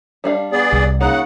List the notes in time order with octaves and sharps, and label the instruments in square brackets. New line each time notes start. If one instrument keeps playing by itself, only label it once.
[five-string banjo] G3 D4 F5
[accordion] B3 G#4 D5
[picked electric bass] C2
[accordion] C#3 F#5 [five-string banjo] A#3 D#4 F4